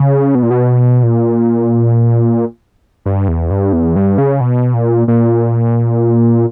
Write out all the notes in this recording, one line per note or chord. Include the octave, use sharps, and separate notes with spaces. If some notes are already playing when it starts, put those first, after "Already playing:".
Already playing: C#3
B2
A#2
B2
A#2
G2
E2
G2
E2
G2
C#3
B2
A#2
A#2